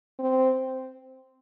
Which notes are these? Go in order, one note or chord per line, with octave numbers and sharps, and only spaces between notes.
C4